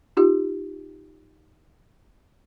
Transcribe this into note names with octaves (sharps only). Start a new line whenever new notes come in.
D#4 F4 G4